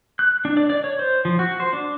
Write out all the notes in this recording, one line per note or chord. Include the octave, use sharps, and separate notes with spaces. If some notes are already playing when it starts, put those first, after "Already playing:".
F#6
D4
D5
D5
C#5
C5
F3
F#4
C5
D4